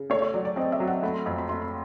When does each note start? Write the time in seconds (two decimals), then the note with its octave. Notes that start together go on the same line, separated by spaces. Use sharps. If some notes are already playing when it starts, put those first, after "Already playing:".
Already playing: C#3
0.10 A3 C#5
0.22 C#5
0.34 F#3 D5
0.45 D5
0.56 C4 D#5
0.72 E5
0.80 F#3
0.87 F#5
1.03 A3 B5
1.14 C6
1.26 F2 B5
1.38 B5
1.49 A3 C6
1.62 B5